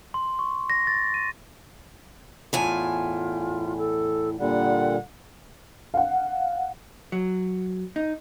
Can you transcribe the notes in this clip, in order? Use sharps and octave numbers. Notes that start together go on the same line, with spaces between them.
C6
C#6
A#6
A6
D#7
E2 A2 F4 G#5
A4
A#2 D3 G3 F#5
F5 F#5
F#3
D#4